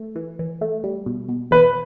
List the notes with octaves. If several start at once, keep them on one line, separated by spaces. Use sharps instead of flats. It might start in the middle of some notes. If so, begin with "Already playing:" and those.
Already playing: A3
E3
E3
A3
G3
B2
B2
E2 B4